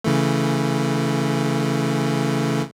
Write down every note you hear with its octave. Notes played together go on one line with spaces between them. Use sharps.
C#3 E3 A3